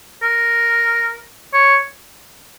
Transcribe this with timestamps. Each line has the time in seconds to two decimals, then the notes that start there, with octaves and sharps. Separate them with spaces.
0.23 A#4
1.53 C#5